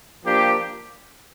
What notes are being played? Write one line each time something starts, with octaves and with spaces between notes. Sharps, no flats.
F3 A#3 D4 G4